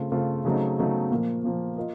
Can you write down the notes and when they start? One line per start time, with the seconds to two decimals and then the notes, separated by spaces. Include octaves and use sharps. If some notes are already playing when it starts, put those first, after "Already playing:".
Already playing: C#3 A3 C4 F4
0.12 C#3 A3 C4 F4
0.45 C#3 F#3 A3 C4 D#4
0.78 C#3 F#3 A3 C4 D#4
1.11 A#2 F3 A#3
1.44 A#2 F3 A#3
1.77 F4 A#4 D#5